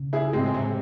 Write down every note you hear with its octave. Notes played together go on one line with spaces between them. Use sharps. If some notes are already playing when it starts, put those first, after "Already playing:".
Already playing: C#3
E4 G#4
G#2 G#3 C4
A2
C3